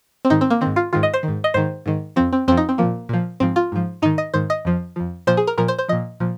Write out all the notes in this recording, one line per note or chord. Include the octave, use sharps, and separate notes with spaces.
C4
G#2 D#3 D#4
C4
A#3
G#2 D#3 C4
F4
G#2 D#3 F4
D#5
C5
D#3
G#2
D#5
G#2 D#3 C5
G#2 D#3
F2 F3 C4
C4
F2 F3 C4
D#4
C4
A#2 F3 A#3
A#2 F3
G#2 F3 C4
F4
G#2 F3
G#2 D#3 D#4
D#5
G#2 D#3 C5
D#5
F2 F3
F2 F3
A#2 F3 C5
G#4
A#4
A#2 F3 A#4
C5
C5
A#2 F3 D#5
A#2 F3